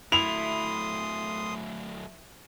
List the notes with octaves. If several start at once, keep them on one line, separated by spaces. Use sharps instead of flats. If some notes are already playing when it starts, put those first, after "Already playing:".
F#3 A3 E4 C6 D#6 F7